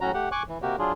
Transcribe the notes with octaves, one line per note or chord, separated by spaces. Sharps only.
A2 F#3 C#4 F#4 A#5
A3 G4 F#5
G#5 C#6 D6 F#6
E3
C3 A#3 F#4 G4
F#3 D4 F4 G#4